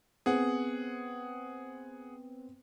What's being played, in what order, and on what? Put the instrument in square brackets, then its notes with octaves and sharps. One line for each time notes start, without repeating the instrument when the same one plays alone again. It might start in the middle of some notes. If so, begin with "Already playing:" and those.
[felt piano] B3 C4 [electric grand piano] G#4 F#5